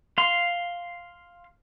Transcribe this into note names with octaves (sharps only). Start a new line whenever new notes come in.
F5 C6